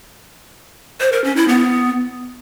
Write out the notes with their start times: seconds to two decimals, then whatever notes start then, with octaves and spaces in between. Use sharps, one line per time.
1.00 C5
1.12 A#4
1.24 C#4
1.36 E4
1.48 B3